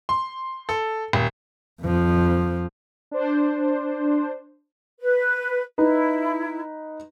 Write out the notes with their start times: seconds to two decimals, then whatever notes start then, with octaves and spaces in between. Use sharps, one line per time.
0.09 C6
0.69 A4
1.13 D#1
1.82 F2 F3
3.11 D4 C5
5.00 B4
5.78 D#4 E4 B4